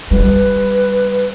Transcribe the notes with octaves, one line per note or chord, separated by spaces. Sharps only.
G3 B4